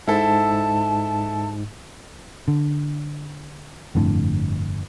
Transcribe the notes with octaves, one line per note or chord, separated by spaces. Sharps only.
G#2 E4 A4 A5
D3
G1 F2 A2 D3